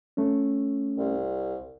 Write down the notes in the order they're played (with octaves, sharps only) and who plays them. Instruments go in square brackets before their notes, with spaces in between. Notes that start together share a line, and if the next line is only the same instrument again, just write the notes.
[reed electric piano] A3 C#4
[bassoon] C2